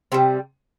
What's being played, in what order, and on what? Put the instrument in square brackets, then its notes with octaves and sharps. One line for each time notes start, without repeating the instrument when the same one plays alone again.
[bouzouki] C3 G3 C4